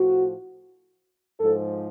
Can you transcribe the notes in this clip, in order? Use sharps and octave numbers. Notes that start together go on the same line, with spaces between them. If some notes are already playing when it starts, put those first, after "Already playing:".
Already playing: A2 F3 F#4
G#2 F3 A4